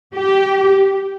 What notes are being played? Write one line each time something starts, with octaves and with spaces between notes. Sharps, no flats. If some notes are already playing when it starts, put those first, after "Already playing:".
G4